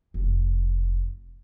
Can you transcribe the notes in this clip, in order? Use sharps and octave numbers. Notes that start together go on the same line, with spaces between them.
F1